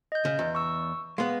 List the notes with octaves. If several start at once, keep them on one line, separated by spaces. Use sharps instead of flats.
D#5 G6
C#3
E2
C#6 E6
G#3 B3 F5